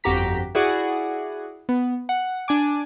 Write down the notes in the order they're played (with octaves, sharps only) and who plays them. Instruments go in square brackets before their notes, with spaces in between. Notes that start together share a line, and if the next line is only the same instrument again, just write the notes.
[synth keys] G1 F2 F#4 G4 A#5 B6
E4 F#4 G#4 D5 F#5
B3
F#5
D4 G#5 D6